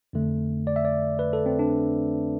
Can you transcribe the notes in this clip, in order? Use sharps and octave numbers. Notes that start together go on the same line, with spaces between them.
F2 D3 A3
D5
E5
D5
B4
A4
C4
D4